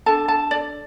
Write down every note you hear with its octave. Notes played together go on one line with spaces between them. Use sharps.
D4 A4 A5
A5
D5